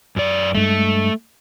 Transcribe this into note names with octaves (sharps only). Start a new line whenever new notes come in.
F#2 D5
G2 G#3 A3